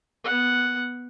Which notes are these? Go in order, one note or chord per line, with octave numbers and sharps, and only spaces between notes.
B3 F#5